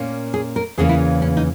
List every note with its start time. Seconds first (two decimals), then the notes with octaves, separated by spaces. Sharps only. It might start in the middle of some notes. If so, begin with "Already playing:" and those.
Already playing: A#2 A#3 C#4
0.34 G#4
0.56 A#4
0.78 E2 C#3 E3 A#3 C#4 G#4
0.89 E4
1.22 C#4
1.37 D#4